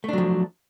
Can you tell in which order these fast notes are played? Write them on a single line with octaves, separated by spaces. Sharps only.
A3 D4 F#3 F3